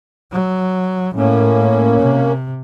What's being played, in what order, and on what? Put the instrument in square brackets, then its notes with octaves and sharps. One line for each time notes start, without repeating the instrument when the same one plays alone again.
[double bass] F#3
[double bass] A2 [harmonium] A#3 C#4
[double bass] C3